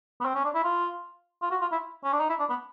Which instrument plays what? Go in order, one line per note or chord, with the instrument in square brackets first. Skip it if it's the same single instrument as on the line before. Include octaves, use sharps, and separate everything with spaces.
[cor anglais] B3
C4
C#4
D4
E4
F4
F4
F#4
F4
E4
C#4
D4
D#4
E4
D4
B3